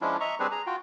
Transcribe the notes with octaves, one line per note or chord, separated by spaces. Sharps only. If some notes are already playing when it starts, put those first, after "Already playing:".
F3 G#3 C#4 D4 E4 F4
D#5 E5 A#5 C#6
G3 C4 D4 G#4 B4 C5
G#4 A#5
F4 F#4 G5